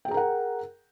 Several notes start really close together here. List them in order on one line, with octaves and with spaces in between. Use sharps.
G5 G#4 A#5 A#4 F#5